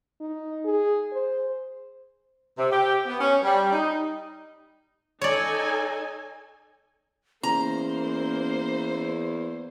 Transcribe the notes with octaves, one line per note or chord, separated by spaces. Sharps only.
D#4
G#4
C5
C3
G4
B3
C#4
G3
D#4
D#4 A4 C#5 D5 G#5
E2 A#3 C#4 C5 A#5